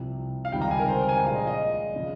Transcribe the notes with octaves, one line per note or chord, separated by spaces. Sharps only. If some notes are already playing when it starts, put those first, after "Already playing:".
Already playing: C2 C3 F3
F5
C#2 C3 D#3 G3 G5
A#5
G#5
A#4
C5
G#5
G5
A#1 A#2 G#3 F5
D#5
D#5
C#3 F3